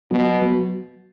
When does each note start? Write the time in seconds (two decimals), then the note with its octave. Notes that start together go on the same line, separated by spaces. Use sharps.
0.11 B2 F#3 B3 F#4
0.42 F#3 B3 F#4